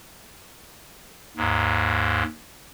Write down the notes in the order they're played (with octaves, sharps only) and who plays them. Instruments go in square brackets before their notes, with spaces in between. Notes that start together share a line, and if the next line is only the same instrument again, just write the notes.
[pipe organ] D#2 G#2